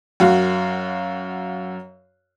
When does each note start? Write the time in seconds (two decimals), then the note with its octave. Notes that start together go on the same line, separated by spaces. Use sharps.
0.20 F#2 F#4 F5